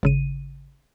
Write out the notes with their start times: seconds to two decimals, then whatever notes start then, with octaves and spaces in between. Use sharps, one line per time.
0.03 G#1 C#3 D#7